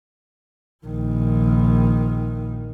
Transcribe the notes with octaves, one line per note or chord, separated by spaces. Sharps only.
A#1 D#3